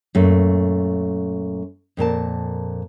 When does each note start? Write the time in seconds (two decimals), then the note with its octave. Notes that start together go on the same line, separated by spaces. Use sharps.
0.15 F#2 A#2 A3
1.97 F2 A#2 A#4 A5